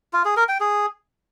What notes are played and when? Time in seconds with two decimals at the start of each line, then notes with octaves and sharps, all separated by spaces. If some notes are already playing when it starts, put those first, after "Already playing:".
0.13 F4
0.25 G#4
0.37 A#4
0.48 G5
0.60 G#4